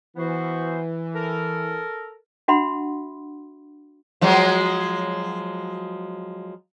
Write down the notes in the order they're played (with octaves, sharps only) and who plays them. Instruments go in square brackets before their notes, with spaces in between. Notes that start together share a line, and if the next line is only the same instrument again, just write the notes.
[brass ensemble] E3 [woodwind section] B3 F#4 C5
[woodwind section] A4 A#4
[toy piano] D4 F#4 E5 F#5 B5 C6
[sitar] F3 F#3 G#3